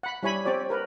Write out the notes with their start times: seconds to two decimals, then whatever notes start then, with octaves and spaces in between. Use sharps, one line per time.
0.03 F#5 B5
0.23 G3 E4 C#5 G#5 B5
0.45 C4 G4 C#5 D5
0.70 A#4 B4